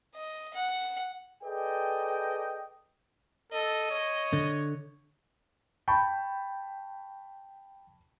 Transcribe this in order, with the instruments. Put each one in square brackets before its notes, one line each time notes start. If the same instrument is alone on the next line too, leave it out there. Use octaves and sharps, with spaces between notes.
[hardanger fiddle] D#5
F#5
[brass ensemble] G#4 A4 B4 D5 D#5 G5
[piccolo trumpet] A4 [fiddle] D#5
[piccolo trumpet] C#5
[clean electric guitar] D3
[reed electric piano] G5 [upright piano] A5 B5 C#6